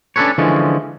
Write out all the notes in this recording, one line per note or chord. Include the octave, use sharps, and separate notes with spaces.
C#4 D4 G#4 A4 B4 C#5
D3 E3 F3 G#3 C#4